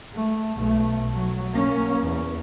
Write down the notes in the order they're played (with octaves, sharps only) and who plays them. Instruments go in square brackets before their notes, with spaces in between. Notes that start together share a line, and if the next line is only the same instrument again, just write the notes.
[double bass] A3
B1 A3
F#3
A#3 C#4
E2